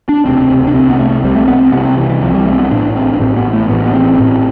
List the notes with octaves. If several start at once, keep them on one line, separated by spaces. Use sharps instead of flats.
D4
E1 D2 C3 C4
D4
C2 C3 C4
B3
A3
C2 C3 G3
A3
B3
C4
C2 C3 B3
C4
E3
E3
C2 C3 F3
G3
A3
C4
B3
A1 A2 D4
C4
D4
A1 A2 C4
B3
A3
A1 A2 B3
B3
C4
A1 A2